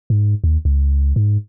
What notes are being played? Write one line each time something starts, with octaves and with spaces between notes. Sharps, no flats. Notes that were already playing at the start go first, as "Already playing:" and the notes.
G#2
D#2
C#2
G#2